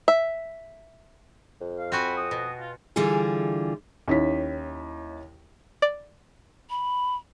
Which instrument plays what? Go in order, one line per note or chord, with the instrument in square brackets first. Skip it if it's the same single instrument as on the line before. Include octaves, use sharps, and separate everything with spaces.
[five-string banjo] E5
[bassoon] F2
[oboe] F5
[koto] C4 F#4 G#5 [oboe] B5
[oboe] D#6
[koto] B2
[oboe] F4
[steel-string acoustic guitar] D3 E3 G3 F4 G#4
[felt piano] D#2 C#4 E4 B6
[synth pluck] D5
[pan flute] B5